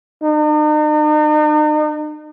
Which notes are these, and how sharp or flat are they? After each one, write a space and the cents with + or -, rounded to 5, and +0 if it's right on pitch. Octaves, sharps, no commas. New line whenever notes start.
D#4 -45